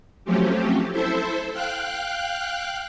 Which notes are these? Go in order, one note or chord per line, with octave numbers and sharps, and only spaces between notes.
F3 F#3 A3 C4 C#4 G4
E4 A4 C5 E5
F5 G5 F#6